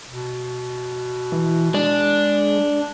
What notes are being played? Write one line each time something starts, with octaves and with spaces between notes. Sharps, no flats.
B2
E3
G#3 D4